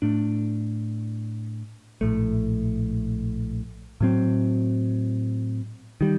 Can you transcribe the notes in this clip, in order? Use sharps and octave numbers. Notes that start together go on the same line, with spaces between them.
A2 A3 D4
A#1 A2 A3
A2 F#3 C4
D#3 G3